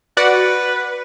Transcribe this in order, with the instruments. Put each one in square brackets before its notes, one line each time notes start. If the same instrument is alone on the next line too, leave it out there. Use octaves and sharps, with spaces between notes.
[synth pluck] F#4 D5 F#5 [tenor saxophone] B4